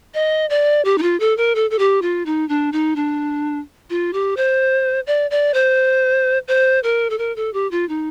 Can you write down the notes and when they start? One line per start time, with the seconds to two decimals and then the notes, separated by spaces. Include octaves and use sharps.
0.14 D#5
0.50 D5
0.85 G4
0.98 D#4
1.02 F4
1.20 A4
1.37 A#4
1.55 A4
1.71 A4
1.79 G4
2.02 F4
2.26 D#4
2.49 D4
2.73 D#4
2.96 D4
3.90 F4
4.13 G4
4.37 C5
5.07 D5
5.31 D5
5.54 C5
6.48 C5
6.83 A#4
7.10 A4
7.18 A#4
7.36 A4
7.53 G4
7.71 F4
7.89 D#4